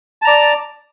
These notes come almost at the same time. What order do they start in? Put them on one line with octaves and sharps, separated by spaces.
A5 A#5 D5